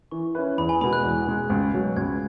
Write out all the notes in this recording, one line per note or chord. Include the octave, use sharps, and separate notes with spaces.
E3 C#6
C#4 E4 B4
E2 B5
G#5
B2 G#3 B5
F#6
E2
B2 G#3
C#2
B2 F#3
C#2 G#6